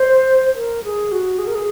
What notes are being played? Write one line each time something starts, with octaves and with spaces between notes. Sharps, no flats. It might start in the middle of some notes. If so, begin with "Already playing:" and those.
Already playing: C5
A#4
G#4
F#4
G#4
A#4
G#4